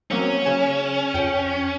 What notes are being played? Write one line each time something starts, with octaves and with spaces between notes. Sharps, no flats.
F#3 A#3 C4 C#4
C#3 G#5 E7
F2 G5